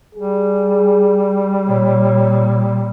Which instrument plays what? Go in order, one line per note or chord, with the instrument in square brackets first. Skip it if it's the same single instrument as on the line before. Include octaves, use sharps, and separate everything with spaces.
[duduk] G3 [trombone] G#4
[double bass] A#2 [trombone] C#5